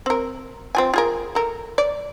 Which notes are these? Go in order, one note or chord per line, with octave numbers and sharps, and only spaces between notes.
C4 A#4
C4 F4 G#5
F4 G#4 A#4
A4 A#4
D5